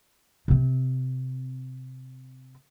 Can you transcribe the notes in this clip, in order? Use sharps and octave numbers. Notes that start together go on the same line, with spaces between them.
C3 C4